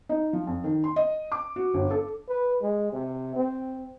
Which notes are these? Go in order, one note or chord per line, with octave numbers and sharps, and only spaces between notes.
D#4
F3
F2
D#3
C6
D#5
D6
F#4
G1
A4
B4
G#3
C3
C4